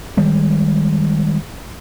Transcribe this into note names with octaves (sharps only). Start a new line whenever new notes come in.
D#3 G3 G#3